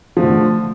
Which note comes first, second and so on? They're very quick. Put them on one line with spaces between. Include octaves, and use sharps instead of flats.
F3 A3 D3